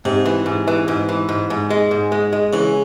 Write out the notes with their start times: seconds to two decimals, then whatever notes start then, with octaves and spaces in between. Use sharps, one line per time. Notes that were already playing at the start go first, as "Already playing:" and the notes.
0.05 G#2 C3
0.25 E3
0.46 G#2
0.68 E3
0.88 G#2
1.09 E3
1.29 G#2
1.50 G#2
1.70 G#3
1.91 G#2
2.12 G#3
2.33 G#3
2.53 C#3 E3